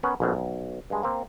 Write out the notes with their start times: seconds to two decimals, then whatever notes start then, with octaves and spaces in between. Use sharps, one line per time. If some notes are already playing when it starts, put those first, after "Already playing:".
0.03 B3 C#4 A#4 B4 C#5
0.20 A#1 F2 B2
0.33 B1
0.90 G2 G#3
1.03 A#3 C4